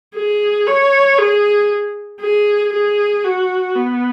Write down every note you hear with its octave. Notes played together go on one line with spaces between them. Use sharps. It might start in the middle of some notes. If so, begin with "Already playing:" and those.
G#4
C#5
G#4
G#4
G#4
F#4
B3